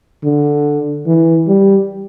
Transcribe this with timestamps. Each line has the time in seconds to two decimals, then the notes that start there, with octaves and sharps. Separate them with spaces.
0.24 D3
1.07 E3
1.47 G3